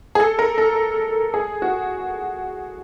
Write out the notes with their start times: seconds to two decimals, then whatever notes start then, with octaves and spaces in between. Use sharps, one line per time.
0.15 G#4
0.20 A4
0.39 A#4
0.58 A4
1.34 G#4
1.62 F#4